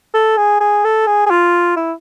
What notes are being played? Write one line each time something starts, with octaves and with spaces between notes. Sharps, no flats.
A4
G#4
G#4
A4
G#4
G#4
F4
E4